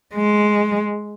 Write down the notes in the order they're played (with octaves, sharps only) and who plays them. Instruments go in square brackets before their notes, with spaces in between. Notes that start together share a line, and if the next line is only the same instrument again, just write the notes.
[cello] G#3